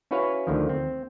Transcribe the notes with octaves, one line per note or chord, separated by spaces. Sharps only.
C#4 E4 F#4 B4 C#5 F5
D2 D3 D#3 F3
C4